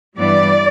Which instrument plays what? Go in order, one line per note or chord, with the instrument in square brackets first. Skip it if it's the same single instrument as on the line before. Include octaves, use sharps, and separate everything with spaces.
[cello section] G2 E3 G3 B3 D5